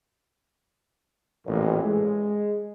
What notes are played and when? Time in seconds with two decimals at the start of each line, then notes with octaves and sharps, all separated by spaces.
1.46 A1 F2 A#2
1.84 G#3